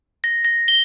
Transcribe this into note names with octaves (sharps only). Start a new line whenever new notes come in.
A#6
A#6
G7